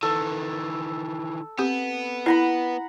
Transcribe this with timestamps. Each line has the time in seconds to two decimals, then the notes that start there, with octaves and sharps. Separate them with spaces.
0.03 D#3 E3 A4
1.59 B3 C4 G4
2.26 E4 F#5 A#5 B5